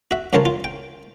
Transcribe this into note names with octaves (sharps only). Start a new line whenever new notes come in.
F#4 E5
G2 C#3 F3 A#4 C#5 A5
F4
G5